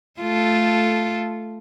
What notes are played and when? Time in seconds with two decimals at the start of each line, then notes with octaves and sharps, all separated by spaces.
0.20 A3 F4 A4